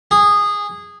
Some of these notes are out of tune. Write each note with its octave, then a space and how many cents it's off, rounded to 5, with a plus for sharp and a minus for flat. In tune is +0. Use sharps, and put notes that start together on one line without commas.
G#4 -15